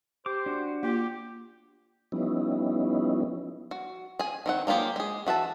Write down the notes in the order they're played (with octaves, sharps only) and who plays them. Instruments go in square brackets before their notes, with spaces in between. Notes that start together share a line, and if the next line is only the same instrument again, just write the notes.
[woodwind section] G4 C5 [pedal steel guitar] D6
[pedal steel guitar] D4 F#4
[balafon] A#3 F4 [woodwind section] G4
[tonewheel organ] F3 G3 B3 C#4 D#4 E4
[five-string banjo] F#4
G#4 G#5
D#3 C4 F#5
F#3 A#3 F4 G4 G#4
G#3 G#4
E3 F#4 E5 A5